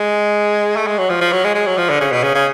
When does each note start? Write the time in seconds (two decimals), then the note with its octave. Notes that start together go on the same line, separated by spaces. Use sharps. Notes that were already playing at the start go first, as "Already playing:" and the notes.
Already playing: G#3
0.76 A3
0.87 G#3
0.98 F#3
1.10 F3
1.21 F3
1.32 F#3
1.44 G#3
1.55 G#3
1.66 F#3
1.77 F3
1.90 D3
2.00 C#3
2.12 B2
2.23 C#3
2.35 C#3